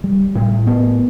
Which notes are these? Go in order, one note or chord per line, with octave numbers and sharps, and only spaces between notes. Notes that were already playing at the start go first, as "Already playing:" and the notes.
G3
A2
B3